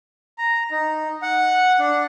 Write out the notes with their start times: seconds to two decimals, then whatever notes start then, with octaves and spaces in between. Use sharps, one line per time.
0.38 A#5
0.71 D#4
1.22 F#5
1.79 D4